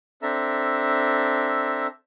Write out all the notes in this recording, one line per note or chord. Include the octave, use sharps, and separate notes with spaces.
C4 D4 A4 E5 A#5 E6